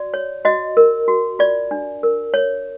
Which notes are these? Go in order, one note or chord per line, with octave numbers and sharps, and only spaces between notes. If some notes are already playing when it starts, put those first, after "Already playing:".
Already playing: F#4 D5
C#5
F#4 D#5
A#4
F#4
F4 D5
D4
A#4
C#5